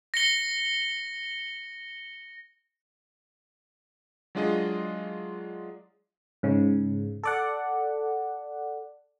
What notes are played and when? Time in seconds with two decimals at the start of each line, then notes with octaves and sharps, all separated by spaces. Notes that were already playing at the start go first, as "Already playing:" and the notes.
0.14 A#6 C#7 G7
4.35 F#3 G#3 D4 F4 G#4 D#5
6.43 G#2 C#3
7.23 A4 D5 F#5